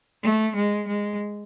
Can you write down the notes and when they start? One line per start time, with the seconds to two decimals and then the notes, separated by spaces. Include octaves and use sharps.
0.23 A3
0.56 G#3
0.87 G#3